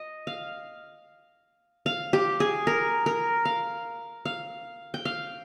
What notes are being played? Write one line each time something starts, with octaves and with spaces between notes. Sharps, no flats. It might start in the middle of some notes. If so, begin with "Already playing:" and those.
Already playing: D#5
F5
F5
G4
G#4
A#4
A#4
F5
F5
G5
F5